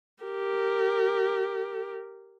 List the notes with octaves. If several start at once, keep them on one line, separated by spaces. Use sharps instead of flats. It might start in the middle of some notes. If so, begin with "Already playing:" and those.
G4 A#4